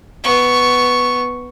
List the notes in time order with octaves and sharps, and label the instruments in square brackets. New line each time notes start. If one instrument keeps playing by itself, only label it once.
[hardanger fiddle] B3 C#6